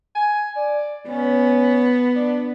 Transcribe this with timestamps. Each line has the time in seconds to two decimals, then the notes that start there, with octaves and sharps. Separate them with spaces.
0.15 G#5
0.56 D5
1.09 B3 C#4
2.15 D4